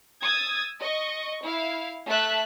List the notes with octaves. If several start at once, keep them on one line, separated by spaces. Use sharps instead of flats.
D#6 E6 G#6 A6
D#5 C#6
E4 F5
A3 E5 A5 F#6